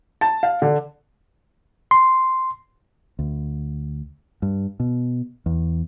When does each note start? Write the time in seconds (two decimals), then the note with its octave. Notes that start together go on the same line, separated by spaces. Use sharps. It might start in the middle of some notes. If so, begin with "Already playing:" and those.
0.21 A5
0.43 F5
0.62 D3
1.91 C6
3.19 D2
4.42 G2
4.80 B2
5.46 E2